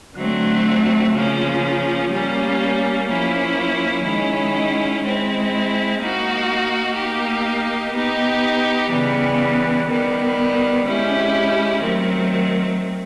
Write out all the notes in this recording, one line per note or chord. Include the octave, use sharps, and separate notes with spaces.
D3 F#3 A3 C4
C#3 F3 A#3 C#4
G3 A#3 C#4
F3 A#3 C#4 E4
D#3 G#3 C#4 E4
G#3 C4 E4
A#3 D#4 F#4
A#3 D#4 G4
B3 D#4 G4
C#3 E3 G3 B3
D#3 G3 B3
G#3 C#4 E4 G4
D#3 F#3 A3 C4